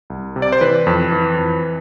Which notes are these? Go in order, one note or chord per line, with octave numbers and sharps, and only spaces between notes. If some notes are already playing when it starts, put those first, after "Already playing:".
C2
C3
D5
C5
E3 B4
F2
E3
F2